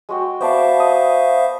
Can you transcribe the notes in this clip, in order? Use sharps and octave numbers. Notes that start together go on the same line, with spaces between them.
G#3 F#4 G5
B3 C5 D5 E5 F5 A5
D#5